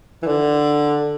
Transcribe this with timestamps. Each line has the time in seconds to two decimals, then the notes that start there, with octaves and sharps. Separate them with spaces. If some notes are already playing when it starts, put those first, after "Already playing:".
0.22 E3
0.26 D3